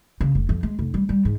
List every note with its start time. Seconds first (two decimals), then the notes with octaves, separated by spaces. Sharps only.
0.21 C#3
0.35 F1
0.49 F2
0.63 G#3
0.79 F1
0.94 G3
1.09 G3
1.25 G#2